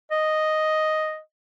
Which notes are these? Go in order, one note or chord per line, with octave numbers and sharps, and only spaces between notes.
D#5